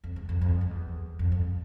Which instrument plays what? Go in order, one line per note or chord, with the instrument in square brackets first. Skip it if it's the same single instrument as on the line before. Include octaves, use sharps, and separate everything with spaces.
[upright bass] F2
E2
F2
F2
F2
E2
F2
F2